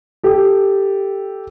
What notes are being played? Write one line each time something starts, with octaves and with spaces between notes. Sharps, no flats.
G4 A4